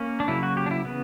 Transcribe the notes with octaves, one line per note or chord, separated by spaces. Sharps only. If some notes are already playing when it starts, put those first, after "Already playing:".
Already playing: A#3 C#4
D4
C#3 F#3 A#3 E4
F#4
G4
D4
E4
C#3 E3 B3